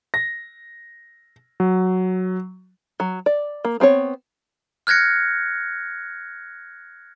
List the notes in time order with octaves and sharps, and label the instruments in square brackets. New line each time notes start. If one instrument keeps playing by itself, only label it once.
[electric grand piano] A#6
F#3
[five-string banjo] F#3
D5
A#3
B3 C4 A#4 C#5
[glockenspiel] F6 F#6 G#6 A#6 C#7